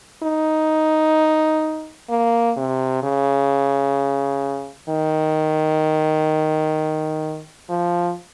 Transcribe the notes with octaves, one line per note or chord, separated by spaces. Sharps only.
D#4
A#3
C3
C#3
D#3
F3